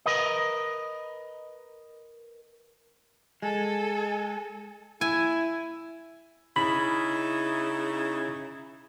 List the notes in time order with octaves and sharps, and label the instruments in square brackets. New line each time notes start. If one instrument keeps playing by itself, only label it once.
[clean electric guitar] A#4 B4 D#5
[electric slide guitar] G#3 [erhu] A4 [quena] G#5
[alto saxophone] E4 [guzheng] G#5
[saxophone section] C#3 D#4 E4 [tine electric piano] B5